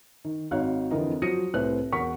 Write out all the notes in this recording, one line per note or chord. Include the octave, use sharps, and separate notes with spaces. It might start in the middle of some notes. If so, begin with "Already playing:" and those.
D#3
G#1 D#4 F#4 C#5 F5 F#6
F2 D3 E3 A#4 D#5
F3 F#3 D#6 A#6 C#7 D#7
C2 A2 B4 C5 F#6
E1 A#4 F#5 C#6 B6